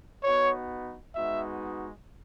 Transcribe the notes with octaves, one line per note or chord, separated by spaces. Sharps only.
B3 D#4 F#4 C#5
G#3 B3 D#4 F#4 E5